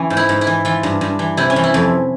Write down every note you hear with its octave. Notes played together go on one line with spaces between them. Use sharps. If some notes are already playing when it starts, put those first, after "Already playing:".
Already playing: E3 C#4
G#2
E4
G#2
E4
E3
E3 F4
G2
G2
E3
C3 E4
C#4
E3
E4
F2